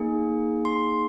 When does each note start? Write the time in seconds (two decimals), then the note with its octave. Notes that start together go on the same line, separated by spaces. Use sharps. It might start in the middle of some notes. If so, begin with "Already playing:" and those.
Already playing: A#3 D#4 G#4
0.65 C6